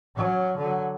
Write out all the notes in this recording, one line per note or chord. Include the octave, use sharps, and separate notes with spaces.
F#3 C#4
D3 F#3